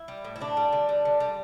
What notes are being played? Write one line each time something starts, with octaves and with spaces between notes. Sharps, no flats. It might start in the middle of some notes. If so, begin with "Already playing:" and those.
Already playing: E4
G3
A2
E4
D3 D4
G3
D3
G3
D3
G3